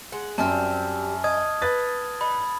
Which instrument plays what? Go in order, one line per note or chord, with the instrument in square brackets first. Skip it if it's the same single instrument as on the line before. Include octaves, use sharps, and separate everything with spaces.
[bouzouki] G#3 F#5
[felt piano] F#2 [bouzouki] G3 C4 G4 [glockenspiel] A5 F6
[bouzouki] D#5 [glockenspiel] D#6 G#6
[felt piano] B4 A6
[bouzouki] D#4 [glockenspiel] B5